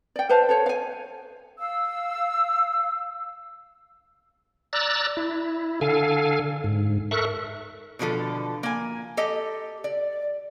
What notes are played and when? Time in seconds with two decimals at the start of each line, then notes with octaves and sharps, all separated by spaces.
0.16 D5 G5
0.29 B4 C5 F5 A5
0.49 A4 C5 C#5
0.66 F5 G#5
1.58 F5 E6
4.73 D5 A#5 E6 F#6 A6
5.17 E4
5.81 D3 A4 F5 G#5
6.64 G#2
7.11 A4 A#4 E5 C#6 F#6
7.99 B2 D3 F3 A4
8.63 A#3 G#5
9.17 G4 A4 D#5
9.84 D5